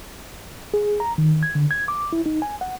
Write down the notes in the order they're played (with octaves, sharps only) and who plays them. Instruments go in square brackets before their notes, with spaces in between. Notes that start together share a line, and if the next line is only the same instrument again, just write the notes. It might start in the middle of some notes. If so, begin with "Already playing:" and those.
[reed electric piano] G#4
A#5
D#3
G#6
D3
G#6
D6
E4
D#4
G#5
F#5